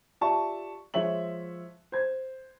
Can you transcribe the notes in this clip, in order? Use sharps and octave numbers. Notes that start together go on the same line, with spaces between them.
F4 G4 D5 E5 A5 C#6
F3 G#3 C#5 E5 F#7
C5 G#6